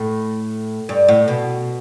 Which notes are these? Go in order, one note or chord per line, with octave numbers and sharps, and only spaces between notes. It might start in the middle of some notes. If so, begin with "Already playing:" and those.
Already playing: A2
G2
A2
B2